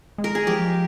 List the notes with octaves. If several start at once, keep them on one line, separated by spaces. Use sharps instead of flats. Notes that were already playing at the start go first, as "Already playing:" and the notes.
G#3
A#4
G#4
F3 G4